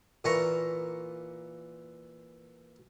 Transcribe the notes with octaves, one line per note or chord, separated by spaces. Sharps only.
A#2 E3 A#4 A5 A#5 C#6